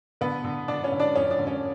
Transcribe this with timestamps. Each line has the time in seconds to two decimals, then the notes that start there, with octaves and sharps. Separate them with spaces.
0.21 D3 B3 B4
0.44 D3
0.68 D3 D4 D5
0.84 C#4 C#5
0.92 D3
1.00 D4 D5
1.15 F2 C#4 C#5
1.31 D4 D5
1.39 D3
1.47 C#4 C#5